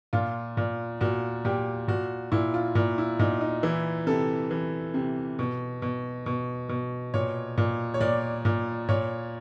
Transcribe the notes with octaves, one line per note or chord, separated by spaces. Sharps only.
A#2 F4
A#2
A#2 F#4
A#2 G4
A#2 F#4
A#2 E4
F4
A#2
E4
A#2 D#4
D#4
E3 E4
C3 A4
E3
C3
B2
B2
B2
B2
A#2 C#5
A#2
C#5
A#2 D5
A#2
A#2 C#5